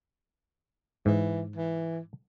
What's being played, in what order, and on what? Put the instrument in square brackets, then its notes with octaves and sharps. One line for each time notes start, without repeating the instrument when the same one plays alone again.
[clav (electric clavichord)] G#2 [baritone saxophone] E3
[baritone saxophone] E3